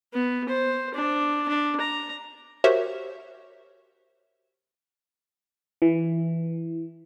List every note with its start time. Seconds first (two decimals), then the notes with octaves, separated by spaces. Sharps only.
0.13 B3
0.49 C5
0.94 D4
1.48 D4
1.81 A#5
2.64 F#4 G4 A#4 C5 C#5 E5
5.82 E3